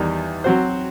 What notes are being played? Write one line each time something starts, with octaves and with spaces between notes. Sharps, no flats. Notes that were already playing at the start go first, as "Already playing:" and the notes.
Already playing: E2 D#3 G3 D#4
F#3 C4 F#4 C5